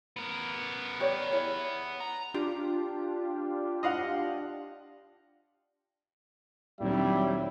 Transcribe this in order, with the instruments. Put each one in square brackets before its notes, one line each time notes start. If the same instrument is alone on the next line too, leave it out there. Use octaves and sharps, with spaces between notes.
[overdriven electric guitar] B3 A#4
[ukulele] G4 C#5 D5
E4 G#4 C#5
[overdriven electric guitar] A#5
[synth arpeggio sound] D4 F4 G4
[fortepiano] D#5 F5 F#5
[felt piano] D2 A#2 D#3 [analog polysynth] F#3 C4 E4 [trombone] G3 [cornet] E5